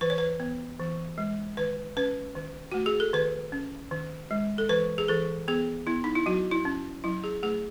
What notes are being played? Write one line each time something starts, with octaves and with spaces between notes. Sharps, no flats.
E3 B4
C#5
B4
B3
E3
G#3
D#3 B4
C#4 B4
D#3
A3 F#4
G#4
A4
D#3 B4
C#4
D#3
G#3
A4
E3 B4
G#4
E3 A4
B3 G#4
B3 E4
D#4
E4
F#3 F#4
E4
C#4
F#3 E4
G#4
A3 G#4